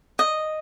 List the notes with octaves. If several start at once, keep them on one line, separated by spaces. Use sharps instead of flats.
D#5